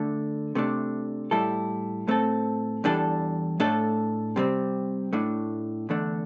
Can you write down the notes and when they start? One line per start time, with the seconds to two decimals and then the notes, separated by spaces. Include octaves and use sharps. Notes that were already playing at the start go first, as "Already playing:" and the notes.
Already playing: D3 A3 D4
0.55 C3 A3 D4
1.31 A2 G3 E4 A4
2.08 A2 A3 C4 A4
2.84 E2 E3 G3 D4 A4
3.60 A2 A3 D4 A4
4.36 C3 G3 C4
5.13 A2 A3 D4
5.89 E2 D3 A3 D4